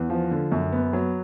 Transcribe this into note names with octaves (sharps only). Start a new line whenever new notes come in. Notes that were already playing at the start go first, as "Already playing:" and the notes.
Already playing: E2
F3
D3
F#2
B3
F#3